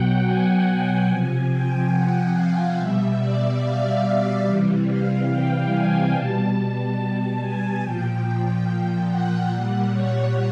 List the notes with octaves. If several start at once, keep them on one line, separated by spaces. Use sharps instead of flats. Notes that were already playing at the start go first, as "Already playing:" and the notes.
Already playing: B2 F#3 F#5 G5
G#5
C3 F3 G#5
G5
F#5
F5
B2 G3 E5
D5
F5
C3 E3 G3
F5
G5
G#5
B2 G3 A5
G#5
A#2 F3 G5
G5
F#5
A#2 G3 F#5
C#5